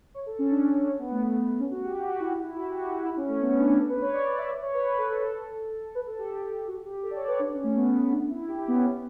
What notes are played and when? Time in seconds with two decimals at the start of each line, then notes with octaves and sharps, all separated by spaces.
0.15 C#5
0.26 A4
0.39 C#4
0.51 D4
0.69 D4
0.86 C#4
0.99 B3
1.11 A3
1.23 B3
1.60 C#4
1.71 F#4
1.84 G4
1.96 G4
2.08 F#4
2.20 E4
2.44 E4
2.56 F#4
2.69 G4
2.80 F#4
2.92 E4
3.05 E4
3.17 C#4
3.28 A3
3.41 B3
3.50 C#4
3.59 D4
3.68 C#4
3.77 A4
3.89 B4
4.01 C#5
4.13 D5
4.25 D5
4.38 E5
4.49 D5
4.62 C#5
4.74 B4
4.86 B4
4.98 A4
5.10 A4
5.95 B4
6.07 A4
6.19 G4
6.67 F#4
6.85 G4
7.03 A4
7.11 D5
7.16 C#5
7.27 B4
7.39 D4
7.52 C#4
7.64 A3
7.76 B3
8.00 B3
8.12 D4
8.30 E4
8.48 G4
8.61 E4
8.68 B3
8.73 C#4